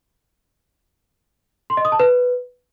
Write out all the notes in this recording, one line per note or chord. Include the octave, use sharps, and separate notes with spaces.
C6
D#5
D#6
A5
B4